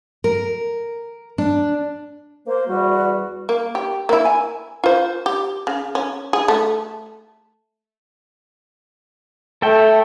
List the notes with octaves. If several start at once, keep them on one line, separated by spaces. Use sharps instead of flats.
A#4
D4
A#3 C5
E2 G3 F#4
A#3
G4
A#3 E4
G#5
F4 C5
G4
C#3
C#4
G#4
A3
A3 A4 E5 G5